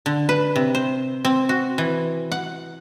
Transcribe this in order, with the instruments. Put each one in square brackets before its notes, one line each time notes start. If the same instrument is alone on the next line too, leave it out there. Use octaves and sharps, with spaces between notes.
[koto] D3
B4
C3
C5
C4
F#4
E3
F#5